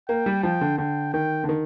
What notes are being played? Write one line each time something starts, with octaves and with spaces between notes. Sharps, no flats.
A#3 G5
G3
F3 G5
D3
D3 G5
D#3 G5
D3
D#3